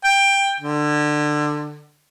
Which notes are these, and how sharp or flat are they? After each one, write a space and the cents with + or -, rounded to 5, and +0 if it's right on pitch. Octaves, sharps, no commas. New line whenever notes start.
G5 +15
D3 +20